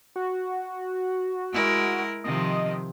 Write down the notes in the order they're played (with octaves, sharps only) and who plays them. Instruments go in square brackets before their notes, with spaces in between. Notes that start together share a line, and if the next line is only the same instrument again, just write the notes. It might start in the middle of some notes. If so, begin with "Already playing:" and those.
[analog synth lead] F#4
[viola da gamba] G#3 E4 A#4
[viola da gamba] C3 D#3 F3 [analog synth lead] D#5